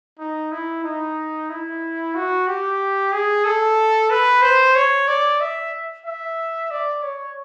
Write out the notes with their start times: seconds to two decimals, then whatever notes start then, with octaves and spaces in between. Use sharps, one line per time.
0.19 D#4
0.52 E4
0.84 D#4
1.50 E4
2.15 F#4
2.48 G4
3.13 G#4
3.45 A4
4.11 B4
4.42 C5
4.76 C#5
5.08 D5
5.41 E5
6.06 E5
6.71 D5
7.03 C#5